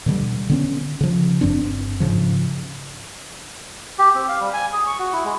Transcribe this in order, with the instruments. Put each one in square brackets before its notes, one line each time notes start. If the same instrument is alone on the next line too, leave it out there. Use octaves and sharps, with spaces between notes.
[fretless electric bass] B2 D3 F3 G3
D3 B3 C#4
C#3 F3
G1 G2 C4 D4
G#2 C#3 F3
[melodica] G4
C4
F5
G3
G#5
G#4
C#6
F#4
E4
G#3